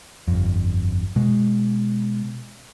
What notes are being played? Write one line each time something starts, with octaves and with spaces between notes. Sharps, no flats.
G1 F2
B2 G#3